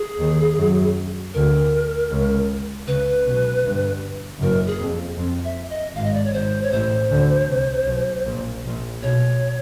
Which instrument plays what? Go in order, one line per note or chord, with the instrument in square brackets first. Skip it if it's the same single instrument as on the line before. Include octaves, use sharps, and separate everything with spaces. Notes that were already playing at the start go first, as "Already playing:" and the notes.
Already playing: [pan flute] G#4
[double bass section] D#2 D#3
F#2 F#3
[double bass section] D2 D3 [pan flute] A#4
[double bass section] C#2 C#3
[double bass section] C#2 C#3 [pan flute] B4
[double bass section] B1 B2
G1 G2
[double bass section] F#1 F#2 [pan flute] A#4
[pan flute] G#4
[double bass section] F2
F2
[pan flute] E5
D#5
[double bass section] G#1 G#2 [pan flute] F5
[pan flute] D#5
D5
C#5
[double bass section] G#1 G#2 [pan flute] C5
[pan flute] C#5
[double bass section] A1 A2 [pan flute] C5
[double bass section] D2 D3
C2 C3
B1 B2
A#1 A#2
A#1 A#2
[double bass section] B1 B2 [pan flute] C#5